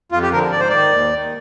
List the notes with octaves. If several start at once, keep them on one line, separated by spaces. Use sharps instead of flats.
F2 F4
G4
D3 F3 A#4
G#2 D5
C5
D#3 D5
D#2
D#3